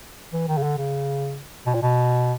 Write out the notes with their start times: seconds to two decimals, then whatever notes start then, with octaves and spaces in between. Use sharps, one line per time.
0.33 E3
0.48 D#3
0.58 C#3
0.63 D3
0.78 C#3
1.66 B2
1.74 A#2
1.82 B2